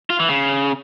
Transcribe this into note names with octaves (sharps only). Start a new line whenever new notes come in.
F4
E3
C#3